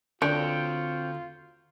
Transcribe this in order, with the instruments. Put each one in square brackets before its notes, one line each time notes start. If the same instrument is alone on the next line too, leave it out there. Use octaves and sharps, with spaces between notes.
[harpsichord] D2 [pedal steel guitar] C4 C#5 G5 [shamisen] D4 [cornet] F4